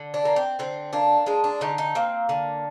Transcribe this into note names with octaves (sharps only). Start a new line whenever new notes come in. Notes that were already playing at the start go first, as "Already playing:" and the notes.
Already playing: D3
D4
A#3
C4
D3 C4
A#3 D4
G#3 D4
D4
D3 D#4
D#4
A#3 C4
D3